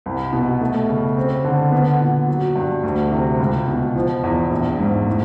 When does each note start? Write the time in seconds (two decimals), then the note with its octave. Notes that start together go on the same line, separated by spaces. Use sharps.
0.06 C2
0.33 B2
0.61 A3
0.89 C#3
1.17 C4
1.44 D3
1.72 B3
2.00 A#2
2.28 F#3
2.56 G2
2.83 D2
3.12 C3
3.40 C#2
3.68 B2
3.96 F3
4.24 E2
4.51 A#1
4.79 G#2
5.07 A2